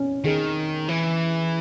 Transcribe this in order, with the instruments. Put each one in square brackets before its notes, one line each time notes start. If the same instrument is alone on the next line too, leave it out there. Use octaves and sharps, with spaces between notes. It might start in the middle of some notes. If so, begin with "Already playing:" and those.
Already playing: [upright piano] C#4
[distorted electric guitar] D#3 [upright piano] G#4
[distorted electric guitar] E3